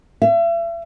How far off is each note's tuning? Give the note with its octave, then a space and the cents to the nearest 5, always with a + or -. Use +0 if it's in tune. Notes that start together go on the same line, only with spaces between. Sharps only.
E5 +40